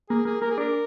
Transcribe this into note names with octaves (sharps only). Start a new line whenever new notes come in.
A#3 G#4
A#3 G#4
A#3 A#4
G#4
D4 A#4